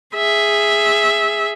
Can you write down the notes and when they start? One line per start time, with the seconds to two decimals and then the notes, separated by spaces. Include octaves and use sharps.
0.16 G#4 E5